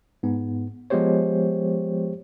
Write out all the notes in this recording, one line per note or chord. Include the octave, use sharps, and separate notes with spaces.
G#2 B3
F3 G#3 B3 G4 C5 C#5